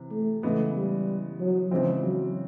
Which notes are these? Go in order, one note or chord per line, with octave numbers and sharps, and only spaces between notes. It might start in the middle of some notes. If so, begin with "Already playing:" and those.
Already playing: C3 E3
A3
C#3 E3 G#3 A3 B3
G3
F#3
C#3 E3 F3 G#3 C4
F#3